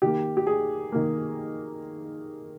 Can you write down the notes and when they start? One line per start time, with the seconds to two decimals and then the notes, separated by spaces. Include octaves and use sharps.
0.02 D#3 A#3 G4
0.37 G4
0.47 G#4
0.92 D#3 A#3